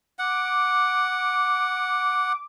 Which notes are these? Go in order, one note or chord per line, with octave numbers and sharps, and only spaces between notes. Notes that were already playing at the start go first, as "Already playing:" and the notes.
F#5 D6